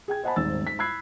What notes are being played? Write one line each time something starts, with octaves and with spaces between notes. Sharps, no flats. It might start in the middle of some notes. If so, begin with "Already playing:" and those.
G#4 G5 G#6
C5 D#5 F#5 G#5 A5 B5
D#1 G#1 G#2 E6 A6
G#2 B6
B5 E6 F#6 G#6 C7